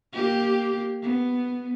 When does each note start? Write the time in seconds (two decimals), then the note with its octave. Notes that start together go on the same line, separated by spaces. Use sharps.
0.13 A#3 G4
1.02 B3